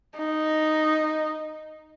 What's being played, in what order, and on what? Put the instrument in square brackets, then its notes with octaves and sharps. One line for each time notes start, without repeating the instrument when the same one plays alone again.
[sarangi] D#4